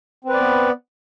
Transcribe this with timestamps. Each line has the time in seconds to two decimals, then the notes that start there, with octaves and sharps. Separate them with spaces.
0.24 C4
0.29 B4
0.34 D5
0.38 B3